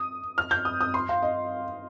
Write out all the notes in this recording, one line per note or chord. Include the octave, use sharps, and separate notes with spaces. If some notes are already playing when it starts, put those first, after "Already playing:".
Already playing: D#6
F6
G6
D#6
D#6
C6
F5
D#5